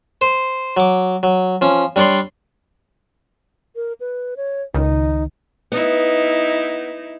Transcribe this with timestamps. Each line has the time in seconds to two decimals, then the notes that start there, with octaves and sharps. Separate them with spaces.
0.21 C5
0.77 F#3 D6
1.23 F#3
1.61 F3 C#4
1.96 G3 D4 C#5 D5 C6
3.76 A#4
4.00 B4
4.37 C#5
4.75 C#2 D#3 D#4
5.72 B3 D#4 E4